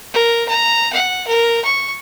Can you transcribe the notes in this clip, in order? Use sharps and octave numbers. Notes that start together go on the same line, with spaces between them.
A#4
A#5
F#5
A#4
C#6